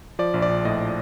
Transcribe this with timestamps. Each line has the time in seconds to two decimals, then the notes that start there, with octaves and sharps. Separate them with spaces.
0.19 F3 D5
0.34 A#1
0.42 D5
0.49 A#1
0.65 A2 D#5